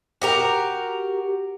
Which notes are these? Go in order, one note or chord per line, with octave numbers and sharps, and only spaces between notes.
F#4 G4 A#4